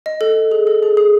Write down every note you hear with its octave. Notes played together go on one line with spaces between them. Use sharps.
D#5
A4
G#4
A4
G#4
G#4